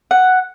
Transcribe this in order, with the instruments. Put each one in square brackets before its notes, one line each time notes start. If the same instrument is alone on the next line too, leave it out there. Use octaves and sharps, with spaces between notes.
[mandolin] F#5